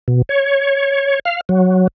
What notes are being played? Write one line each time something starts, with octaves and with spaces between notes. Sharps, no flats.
B2
C#5
F5
F#3